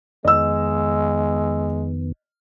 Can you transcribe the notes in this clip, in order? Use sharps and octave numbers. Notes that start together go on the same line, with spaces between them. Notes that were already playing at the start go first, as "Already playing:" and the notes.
F2 D#3 G#3 B3 D#5 E6